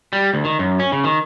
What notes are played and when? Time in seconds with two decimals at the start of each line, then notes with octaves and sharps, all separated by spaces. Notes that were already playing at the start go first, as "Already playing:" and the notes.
0.13 G3
0.34 D2
0.45 D#3
0.59 F#2
0.80 C#4
0.92 C#3
1.04 D#3